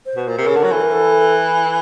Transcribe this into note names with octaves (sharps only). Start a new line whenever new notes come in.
C5
B2
A#2
C3 A#4
C#3
D3
F#3
E3 A4
A#4
A4